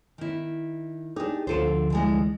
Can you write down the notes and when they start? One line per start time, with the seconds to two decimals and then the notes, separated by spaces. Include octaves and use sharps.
0.18 D#3 E4
1.16 D4 D#4 G4 G#4
1.47 D2 D3 F3 A4 C5
1.90 D3 E3 G#3